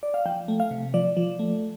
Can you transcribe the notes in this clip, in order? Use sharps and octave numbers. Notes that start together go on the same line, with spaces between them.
D5
F5
F3 G5
A3
F5
C3
F3 D5
F3
A3